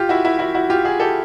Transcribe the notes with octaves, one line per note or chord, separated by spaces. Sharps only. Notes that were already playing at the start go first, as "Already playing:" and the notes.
Already playing: F4 G4
E4 F#4
E4 F#4
E4 F#4
E4 F#4
F4 G4
F#4 G#4
G4 A4